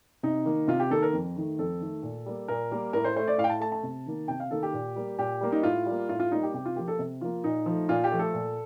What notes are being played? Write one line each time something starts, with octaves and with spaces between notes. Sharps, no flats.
C3 D#4
D#3 A#3
C3 F4
G4
D#3 A#3 A4
A#4
F2
D#3 A3
F2 A4
D#3 A3
A#2
G3 A#3
A#2 A#4
G3 A#3
A2 A#4
C5
A3 C5
D5
A2 F5
G5
A5
A3 A5
A5
C3
D#3 A#3
C3 G5
F5
D#3 A#3 A4
G4
A#2
G3 A#3
A#2 G4
G3 A#3
D#4
A2 F4
G3
A#3
A2 F4
F4
G3 A#3 D#4
G4
C3 G4
F4
F3 A#3 G4
A4
C3
F3 A#3 F4
A#2 D#4
F3 A3
A#2 F4
G4
F3 A3
A4
A#2